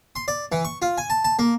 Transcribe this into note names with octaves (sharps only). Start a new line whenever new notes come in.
C6
D5
E3
C#6
F4
G#5
A5
A5
A#3